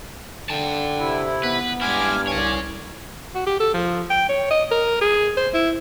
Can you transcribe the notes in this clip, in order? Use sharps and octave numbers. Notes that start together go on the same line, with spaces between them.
D3 G5 A5
C3 E4
B3 B4
G2 G#3 E4 G#5 D6 F6
C2 G#4 C#5 G#5 D6
F#4
G4
A4
F3
G5
C#5
D#5
A#4
G#4
C5
E4